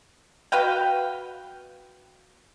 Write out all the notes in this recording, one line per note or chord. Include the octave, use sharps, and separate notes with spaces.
F#4 B4 F5 G5